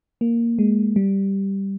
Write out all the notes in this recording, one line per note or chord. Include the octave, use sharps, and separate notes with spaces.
A#3
G#3
G3